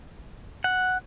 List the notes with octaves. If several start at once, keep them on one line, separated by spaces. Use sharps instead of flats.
F#5